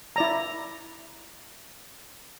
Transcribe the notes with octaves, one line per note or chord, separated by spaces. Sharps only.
E4 D5 A#5